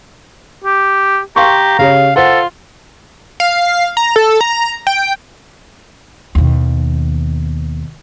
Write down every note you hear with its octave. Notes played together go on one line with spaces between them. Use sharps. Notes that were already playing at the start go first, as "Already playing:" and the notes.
G4
G4 F5 A#5 C6 C#6
C#3 G4 C#5 F5
F4 A4 C5 F#5
F5
A#5
A4
A#5
G5
D#2 B2